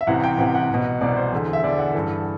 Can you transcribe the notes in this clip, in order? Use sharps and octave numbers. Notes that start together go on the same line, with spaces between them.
E5
C2 C3 E3 F#5
G5
C2 C3 E3 F#5
F#5
C2 B2
C2 B2 D5
C5
E2 D3
E5
E2 D3 D5
F#5
G2 E3 A4